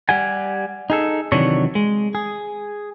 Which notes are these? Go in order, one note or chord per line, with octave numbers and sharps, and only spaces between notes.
G3 G4 F#5 G#5
D#4 G#4 A4
C3 D#3 E3 F#3 D4 C#5
G#3
G#4